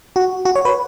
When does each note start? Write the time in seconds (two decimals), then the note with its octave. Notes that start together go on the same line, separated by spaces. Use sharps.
0.16 F#4
0.45 F#4
0.56 C#5
0.65 B4